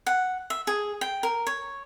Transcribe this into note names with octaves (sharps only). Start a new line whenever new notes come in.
F#5
E5
G#4
G5
A#4
C#5